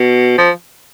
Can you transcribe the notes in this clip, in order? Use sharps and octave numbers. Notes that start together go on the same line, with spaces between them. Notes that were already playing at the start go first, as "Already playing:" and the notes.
Already playing: B2
F3